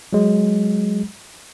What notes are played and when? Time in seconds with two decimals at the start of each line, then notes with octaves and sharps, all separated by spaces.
0.13 F#3 G#3